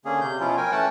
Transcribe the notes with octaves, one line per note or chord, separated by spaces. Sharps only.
D3 A#3 C#4 G#4
C3 G6
B2 F3 C#4 E4 F4
A#4 G5 G#5
E3 A3 C#4 F#5 G5 A5